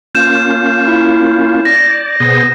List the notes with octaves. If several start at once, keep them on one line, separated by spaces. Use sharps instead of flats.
A#3 C#4 F4 G6 E7
E4
D5 A#6
B2 B3 G#4 C5